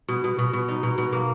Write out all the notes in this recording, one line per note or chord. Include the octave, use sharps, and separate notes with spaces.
B2
B2
B2
B2
D#4
B2
B2
A#3